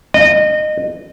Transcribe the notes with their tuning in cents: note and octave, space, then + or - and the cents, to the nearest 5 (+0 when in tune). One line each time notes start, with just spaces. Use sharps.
D#5 -25